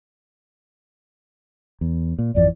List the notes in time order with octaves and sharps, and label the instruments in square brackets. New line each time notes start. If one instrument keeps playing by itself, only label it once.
[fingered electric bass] E2
A#2
[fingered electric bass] G#1 F2 E3 [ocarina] D5